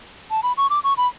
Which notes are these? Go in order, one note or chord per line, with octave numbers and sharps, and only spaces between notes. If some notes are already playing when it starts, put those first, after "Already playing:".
A5
B5
C#6
D6
C#6
B5